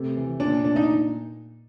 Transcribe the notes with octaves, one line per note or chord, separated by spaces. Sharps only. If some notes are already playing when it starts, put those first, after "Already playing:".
Already playing: C3 A3
E3
A#2 D4
A#2 D4
D#4